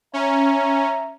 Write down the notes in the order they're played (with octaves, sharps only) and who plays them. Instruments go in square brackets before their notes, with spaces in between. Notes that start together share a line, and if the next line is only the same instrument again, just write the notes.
[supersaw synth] C#4 [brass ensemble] E5 A#5